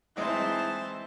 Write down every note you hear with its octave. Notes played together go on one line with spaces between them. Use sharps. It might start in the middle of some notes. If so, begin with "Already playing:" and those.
E3 G#3 C4 D#4 C5 A5